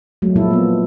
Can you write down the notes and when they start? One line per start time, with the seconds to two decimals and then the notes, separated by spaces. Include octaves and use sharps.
0.22 F#3 G#3 A3
0.36 A#2 F3 A#3 E4 A4
0.51 A#3 B3